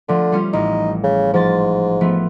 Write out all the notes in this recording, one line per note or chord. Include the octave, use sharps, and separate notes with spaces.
D3 F3 A3
G3 C#4 F4
A1 D#4
C#3
G#2 F3 A6
F3 A3 B3